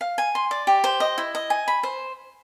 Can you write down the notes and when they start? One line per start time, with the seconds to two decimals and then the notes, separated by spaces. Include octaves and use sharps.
0.01 F5
0.18 G#5
0.35 C6
0.51 D5
0.67 G4
0.84 C5
1.00 D#5
1.18 E4
1.35 D#5
1.50 G#5
1.68 B5
1.83 C5